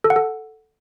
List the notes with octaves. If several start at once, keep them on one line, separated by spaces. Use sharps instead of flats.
A4
F#5
A4